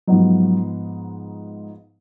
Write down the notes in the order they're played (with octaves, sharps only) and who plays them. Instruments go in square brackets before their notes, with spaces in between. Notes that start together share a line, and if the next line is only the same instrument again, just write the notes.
[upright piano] G#2 F3 B3 D#4 [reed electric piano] F#3